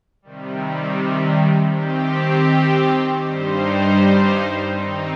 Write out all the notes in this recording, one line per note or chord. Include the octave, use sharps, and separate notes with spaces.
C3 D#3 G3
D#3 C4 G4
G2 G3 D#4 C5
D#3 C4 D#4